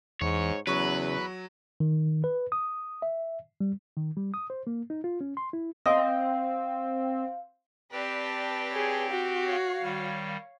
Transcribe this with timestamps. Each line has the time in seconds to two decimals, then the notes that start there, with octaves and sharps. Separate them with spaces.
0.21 E2 G#2 C#5
0.67 E2 C#3 F#3 B4 C#6
1.80 D#3
2.24 B4
2.52 D#6
3.02 E5
3.61 G3
3.97 D#3
4.17 G3
4.34 D#6
4.50 C5
4.67 A#3
4.90 D#4
5.04 F4
5.21 C#4
5.37 C6
5.53 E4
5.86 C4 D#5 F5
7.92 C4 G4 B4 D5 G5 A5
8.70 G#4 C#5
9.11 F#4
9.44 C#5 F5
9.82 D#3 G3